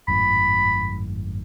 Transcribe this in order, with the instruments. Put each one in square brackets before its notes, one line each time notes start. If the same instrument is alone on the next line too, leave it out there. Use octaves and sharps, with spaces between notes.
[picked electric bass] G#1 F#2 A2 [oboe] B5